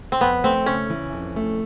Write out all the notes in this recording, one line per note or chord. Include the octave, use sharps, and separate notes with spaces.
C4
F2 B3
A3 C4
C#3 C#4
E3
F2
A3